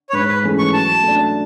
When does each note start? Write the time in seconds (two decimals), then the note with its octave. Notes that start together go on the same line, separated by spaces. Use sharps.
0.09 C#5
0.13 G#2 B4
0.28 B4
0.44 E3 A3 C#4 G#4
0.58 C#6
0.73 F#3 A5
1.03 A3 D4